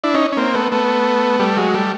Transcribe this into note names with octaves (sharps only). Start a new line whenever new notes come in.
D4 E4
C#4 D#4
C#4
A#3 C4
A3 B3
A3 B3
G3 A3
F#3 G#3
G3 A3